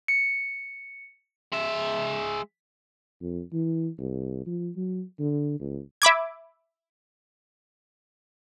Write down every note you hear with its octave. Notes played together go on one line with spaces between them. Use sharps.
C#7
G#3 E5
F2
E3
C2
F3
F#3
D3
C#2
E5 B5 D6 G#6